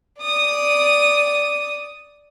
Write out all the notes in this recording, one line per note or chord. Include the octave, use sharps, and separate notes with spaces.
D5 D#6